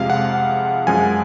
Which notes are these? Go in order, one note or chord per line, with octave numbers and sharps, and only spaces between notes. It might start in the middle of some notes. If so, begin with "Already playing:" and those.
Already playing: F2 C3 F3 G#3 F5
F#5
F#2 F3 G#3 G#5